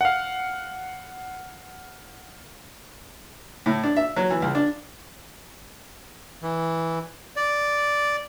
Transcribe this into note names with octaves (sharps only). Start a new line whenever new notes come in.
F5 F#5
A2
D4
E5
F#3
E3
C#2
D4
E3
D5